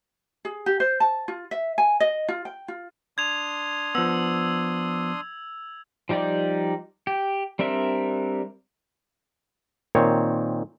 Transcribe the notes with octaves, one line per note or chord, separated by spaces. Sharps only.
G#4
G4
C5
A5
F4
E5
G#5
D#5
F4
G5
F4
D4 C6 D#6 G#6 F7
F3 B3 E6
F3 G3 D#4 G4 D5
G4
G3 C4 D4 A#4 E5
A#2 D#3 C4 C#5